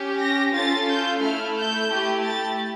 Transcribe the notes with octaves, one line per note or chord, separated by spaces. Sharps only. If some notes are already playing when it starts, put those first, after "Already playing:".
Already playing: C#4 G4
A#6
C#4 F4 A4 A6
G6
A3 E4 A4 F6
G6
A3 E4 G4
A6